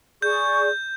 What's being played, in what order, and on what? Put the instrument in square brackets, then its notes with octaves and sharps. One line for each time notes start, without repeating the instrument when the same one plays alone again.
[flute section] G#4 D5 C#6 [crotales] G6